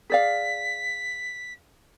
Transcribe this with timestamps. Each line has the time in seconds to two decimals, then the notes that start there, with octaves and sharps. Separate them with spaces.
0.10 G#4 D5 F5 B6